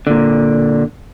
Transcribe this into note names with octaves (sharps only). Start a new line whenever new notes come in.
A#2 D3